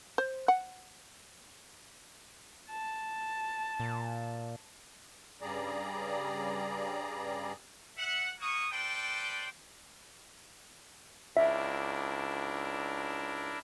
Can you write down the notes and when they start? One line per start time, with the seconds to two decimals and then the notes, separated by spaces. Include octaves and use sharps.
0.18 C5
0.48 F#5
2.70 A5
3.80 A#2
5.42 G2 C#3 G3 G#4 D5 A#5
7.98 E5 F#5
8.40 A#3 F#4 C#5 C#6 D#6
8.71 A4 B4 C5 D5 G5
11.37 C#2 D4 E4 A#4 E5